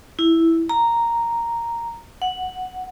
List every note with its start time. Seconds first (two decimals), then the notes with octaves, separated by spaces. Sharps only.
0.19 E4
0.69 A#5
2.22 F#5